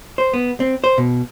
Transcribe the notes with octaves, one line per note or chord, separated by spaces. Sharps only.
C5
B3
C4
C5
B2